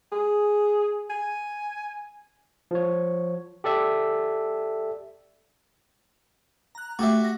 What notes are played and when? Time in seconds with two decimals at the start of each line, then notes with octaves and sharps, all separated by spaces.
0.12 G#4
1.10 G#5
2.71 F3 C#5
3.64 G4 A4 D5 E5
6.75 A#5 F#6
6.99 A3 F#4 G4 E5
7.20 F#5 A#6